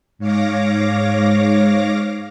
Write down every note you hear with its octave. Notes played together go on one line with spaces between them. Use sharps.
G#2 C#5 F5 D6 A#6